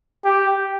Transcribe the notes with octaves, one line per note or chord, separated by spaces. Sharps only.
G4